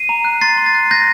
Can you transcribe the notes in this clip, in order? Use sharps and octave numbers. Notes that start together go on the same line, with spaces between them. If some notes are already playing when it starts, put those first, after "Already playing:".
Already playing: C7 D#7
A#5
F#6
C6 A6 C7
C6
A6
F#6
F#6 G6 A#6